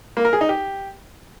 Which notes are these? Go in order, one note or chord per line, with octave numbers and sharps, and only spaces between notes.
A#3
A#4
G#4
D#4
G4